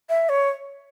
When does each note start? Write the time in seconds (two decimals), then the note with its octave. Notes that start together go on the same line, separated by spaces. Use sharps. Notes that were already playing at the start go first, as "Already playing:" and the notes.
0.09 E5
0.29 C#5